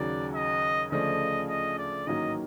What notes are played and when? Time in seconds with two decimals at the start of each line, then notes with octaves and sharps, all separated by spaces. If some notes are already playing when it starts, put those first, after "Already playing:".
Already playing: D#2 C#3 F#3 D5
0.34 D#5
0.92 D2 C#3 F3 A3 D4 D#5
1.49 D#5
1.78 D5
2.07 A1 G#2 D#3 F#3 A#3 D#5